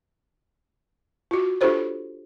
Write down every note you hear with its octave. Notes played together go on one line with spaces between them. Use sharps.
F4 F#4
D4 F4 G4 A4 C5 C#5